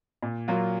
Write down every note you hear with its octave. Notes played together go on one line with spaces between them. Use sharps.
A#2
F#3 A#3 F4